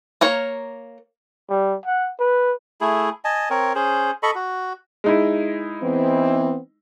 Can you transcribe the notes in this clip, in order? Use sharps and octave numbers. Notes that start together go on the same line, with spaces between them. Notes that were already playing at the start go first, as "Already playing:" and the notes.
A#3 A#4 C#5
G3
F#5
B4
A3 E4 G#4
D#5 G#5 A5
C4 A#4 C#5
C#4 G#4 C5
A4 D#5 B5 C#6
F#4
G#3 D#4 E4
E3 B3 C4